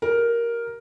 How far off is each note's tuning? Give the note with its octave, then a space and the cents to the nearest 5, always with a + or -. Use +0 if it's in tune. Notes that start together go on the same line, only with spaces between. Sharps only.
G4 -20 A#4 +5